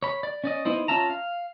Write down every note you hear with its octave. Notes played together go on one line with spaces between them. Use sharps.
C#5 B5
D5
C#4 D5 D#5
B3 D#4 E4 C5
C#4 F4 E5 A5 A#5
F5